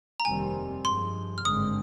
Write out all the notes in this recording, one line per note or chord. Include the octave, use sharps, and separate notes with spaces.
A#5
F1 D#2 D#3 G3 C4 G#5
G2 F3 G#3 C6
F6
G#1 G2 D3 G#3 C4 D#6